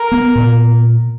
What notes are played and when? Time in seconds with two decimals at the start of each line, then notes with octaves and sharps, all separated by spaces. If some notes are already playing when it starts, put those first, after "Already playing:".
Already playing: A#4
0.12 B3
0.35 A#2